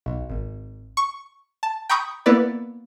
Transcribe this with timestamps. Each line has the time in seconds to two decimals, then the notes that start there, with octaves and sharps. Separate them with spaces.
0.06 B1
0.30 G#1
0.97 C#6
1.63 A5
1.89 G5 A#5 B5 C#6 D#6 G6
2.26 A#3 B3 E4 B4 D5